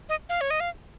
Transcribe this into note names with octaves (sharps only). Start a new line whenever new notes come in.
D#5
F5
C#5
D#5
F5